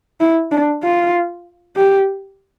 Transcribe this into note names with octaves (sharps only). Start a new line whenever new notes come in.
E4
D4
F4
G4